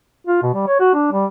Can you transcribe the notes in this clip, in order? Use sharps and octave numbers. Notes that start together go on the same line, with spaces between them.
F4
B2
G3
C#5
F#4
D4
G3